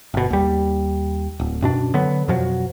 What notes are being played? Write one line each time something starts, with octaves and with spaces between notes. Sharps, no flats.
G1 B2
D#2 G3
D1
F#2 B2 D4
D3 F#3 B3
F2 B2 F3 F#3